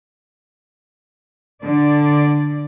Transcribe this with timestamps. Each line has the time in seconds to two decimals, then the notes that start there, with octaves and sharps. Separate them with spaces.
1.62 D3 D5